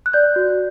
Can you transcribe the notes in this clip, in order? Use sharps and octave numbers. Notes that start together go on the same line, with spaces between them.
F#6
D5 G6
F#4